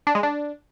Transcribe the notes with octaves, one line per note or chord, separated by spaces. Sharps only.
D4
G#3
D4